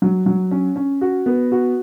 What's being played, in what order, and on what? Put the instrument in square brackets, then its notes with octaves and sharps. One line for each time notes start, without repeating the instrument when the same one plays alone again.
[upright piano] F#3
F#3
C#4
C#4
F#4
B3
F#4